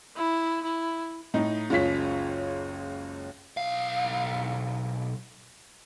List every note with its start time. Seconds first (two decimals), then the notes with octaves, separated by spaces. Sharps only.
0.17 E4
0.63 E4
1.34 A2 D#4
1.70 F#1 C#2 F4 C#5 B6
3.57 B1 F5